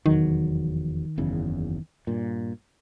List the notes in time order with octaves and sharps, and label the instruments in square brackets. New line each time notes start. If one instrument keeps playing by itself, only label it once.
[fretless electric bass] F1 E2 F#3 [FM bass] D#3
[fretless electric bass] F#1 E2 C#3
G2 A#2